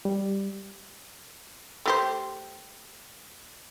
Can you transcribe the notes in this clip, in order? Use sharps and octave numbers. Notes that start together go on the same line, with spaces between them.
G3
A3 G4 C5